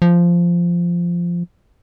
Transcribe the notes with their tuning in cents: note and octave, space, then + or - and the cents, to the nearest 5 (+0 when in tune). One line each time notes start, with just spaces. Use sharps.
F3 -10